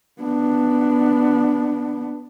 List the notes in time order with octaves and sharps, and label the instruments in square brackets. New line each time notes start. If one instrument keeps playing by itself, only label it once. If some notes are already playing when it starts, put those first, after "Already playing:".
[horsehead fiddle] B3 D4